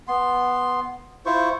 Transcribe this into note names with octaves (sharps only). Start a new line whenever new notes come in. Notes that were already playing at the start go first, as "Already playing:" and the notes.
B3 C6
E4 F4 C5 C#6